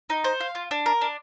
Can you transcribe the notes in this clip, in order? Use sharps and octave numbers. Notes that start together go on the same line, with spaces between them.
D#4
C5
F5
F4
D4
A#4
D4